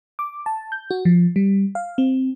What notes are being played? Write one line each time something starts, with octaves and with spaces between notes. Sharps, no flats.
D6
A5
G6
F#4
F3
G3
F5
C4